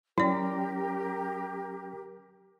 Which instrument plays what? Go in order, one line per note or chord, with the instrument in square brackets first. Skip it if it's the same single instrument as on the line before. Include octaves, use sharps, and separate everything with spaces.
[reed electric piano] F#3 C#4 [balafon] E4 D5 [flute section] G4 A#4